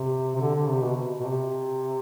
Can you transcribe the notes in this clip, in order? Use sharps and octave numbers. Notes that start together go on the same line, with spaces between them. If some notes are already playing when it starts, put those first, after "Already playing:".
Already playing: C3
C3
D3
D3
C3
B2
B2
C3